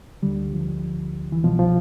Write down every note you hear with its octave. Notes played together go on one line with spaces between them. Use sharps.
D2 D3 G3
F3
E3
C2 B2 F3
F3